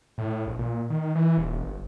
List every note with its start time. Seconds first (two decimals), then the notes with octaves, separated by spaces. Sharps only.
0.18 A2
0.47 A#1
0.59 A#2
0.90 D#3
1.15 E3
1.38 D#1
1.60 G1